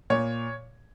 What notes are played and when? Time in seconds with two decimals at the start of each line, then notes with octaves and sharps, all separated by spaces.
0.10 A#2 C#5